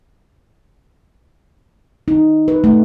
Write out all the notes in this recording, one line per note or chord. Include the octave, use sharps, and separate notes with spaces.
D#4
B4
A3